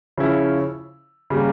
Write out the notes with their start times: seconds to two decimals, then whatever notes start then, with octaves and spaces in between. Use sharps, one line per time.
0.18 C#3 F3 C#4 E4
1.30 C#3 G3 A#3